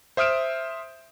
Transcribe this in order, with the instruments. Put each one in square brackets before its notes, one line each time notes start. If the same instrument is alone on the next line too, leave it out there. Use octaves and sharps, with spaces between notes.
[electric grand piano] C5 E5 D#6 F6 D7 E7